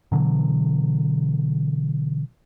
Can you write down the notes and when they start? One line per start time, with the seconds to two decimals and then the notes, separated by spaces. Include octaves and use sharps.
0.12 B2 D3 E3 F#3